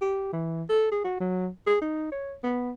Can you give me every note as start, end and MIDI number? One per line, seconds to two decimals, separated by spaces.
0.02 0.28 67
0.33 0.63 52
0.69 0.89 69
0.92 0.99 68
1.05 1.20 66
1.20 1.49 54
1.67 1.79 68
1.81 2.08 63
2.12 2.35 73
2.43 2.71 59